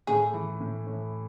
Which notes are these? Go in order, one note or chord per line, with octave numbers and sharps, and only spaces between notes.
A2 G#4
E3
A2
A2